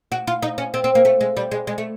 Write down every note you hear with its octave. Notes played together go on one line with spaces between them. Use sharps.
F#4
F4
D#4
C#4
C4
C4
A#3
A3
G#3
G3
G#3
G#3
A3